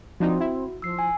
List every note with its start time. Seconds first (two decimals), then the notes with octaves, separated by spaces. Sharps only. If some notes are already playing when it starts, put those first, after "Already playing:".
0.20 F3 C4 D4 D#4 F#4
0.40 E4
0.82 F3 E6 C7
0.99 G#5